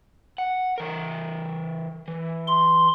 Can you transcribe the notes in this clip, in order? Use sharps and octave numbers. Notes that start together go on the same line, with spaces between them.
F#5
E3 A#4
E3
C6